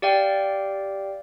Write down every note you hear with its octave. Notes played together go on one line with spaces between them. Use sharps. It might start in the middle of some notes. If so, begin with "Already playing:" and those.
G4 D5 F5 G5